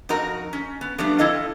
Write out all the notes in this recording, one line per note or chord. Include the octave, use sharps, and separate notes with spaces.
F2 D#4 F#4 A#4 A#5
C#4
B3
F3 G3 A3 B3 D4
C4 E4 A4 D#5 F5